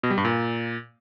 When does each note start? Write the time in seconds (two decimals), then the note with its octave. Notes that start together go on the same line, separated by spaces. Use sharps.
0.03 B2
0.10 G3
0.18 G2
0.25 A#2